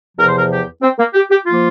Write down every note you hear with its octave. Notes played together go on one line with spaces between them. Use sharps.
E2 C3 F3 A#4
C5
A#4
G4
C4
A#3
G4
G4
F3 A#3 F4